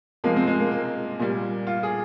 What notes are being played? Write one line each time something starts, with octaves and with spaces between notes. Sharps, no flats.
C3 F3 G#3 A#3
C4
G#3
A#3
A#3
A#2 G3
F4
G#4